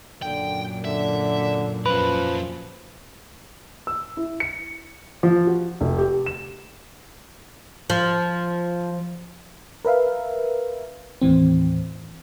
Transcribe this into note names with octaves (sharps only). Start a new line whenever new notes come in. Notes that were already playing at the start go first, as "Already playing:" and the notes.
F#2 A#2 D3 G5
D3 E5
F3 C#4 A#4 B4
E6
E4
C#7
F3
F#4
F1
G4
E7
F3
A#4 B4 E5 F5
D#2 A2 E3 C4